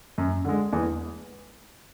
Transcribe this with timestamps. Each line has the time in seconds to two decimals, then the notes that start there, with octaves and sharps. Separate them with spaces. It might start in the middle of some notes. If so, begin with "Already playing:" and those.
0.18 F#2
0.45 D3 G#3
0.73 E2